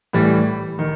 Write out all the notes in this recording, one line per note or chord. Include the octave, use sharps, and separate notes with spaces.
A2 E3 G3
D#3